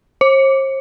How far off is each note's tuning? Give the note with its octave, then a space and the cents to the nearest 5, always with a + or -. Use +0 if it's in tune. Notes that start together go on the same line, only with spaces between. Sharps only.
C5 +45